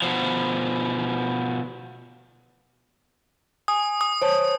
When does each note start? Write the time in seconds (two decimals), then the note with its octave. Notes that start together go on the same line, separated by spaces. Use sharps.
0.02 B2 F3
3.68 G#5 D#6
4.01 D#6
4.22 C5 C#5 A5